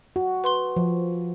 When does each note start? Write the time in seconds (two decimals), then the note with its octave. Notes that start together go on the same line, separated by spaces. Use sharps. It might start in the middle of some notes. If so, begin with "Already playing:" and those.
0.16 F#4
0.44 B4 C6 G7
0.76 F3